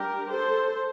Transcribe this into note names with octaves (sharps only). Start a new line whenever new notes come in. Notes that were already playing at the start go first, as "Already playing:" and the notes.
Already playing: G3 D4 G4 A#4
A4 C5